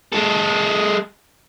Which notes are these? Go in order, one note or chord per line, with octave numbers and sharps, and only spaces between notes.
G#3 A4